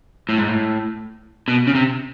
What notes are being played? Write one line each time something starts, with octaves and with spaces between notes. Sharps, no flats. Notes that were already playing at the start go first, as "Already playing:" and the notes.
A2
G#2
A2
B2
C#3
C3